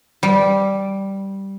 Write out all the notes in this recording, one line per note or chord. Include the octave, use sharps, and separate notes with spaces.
G3